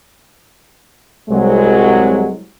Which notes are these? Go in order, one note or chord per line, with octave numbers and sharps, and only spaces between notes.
C2 F#3 G#3